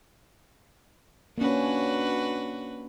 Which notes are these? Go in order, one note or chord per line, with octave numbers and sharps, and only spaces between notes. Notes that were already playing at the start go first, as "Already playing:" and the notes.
A#3 C#4 D4 F#4 B4